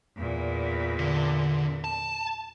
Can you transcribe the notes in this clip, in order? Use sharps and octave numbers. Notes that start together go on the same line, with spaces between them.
E2 A#2
D3
A5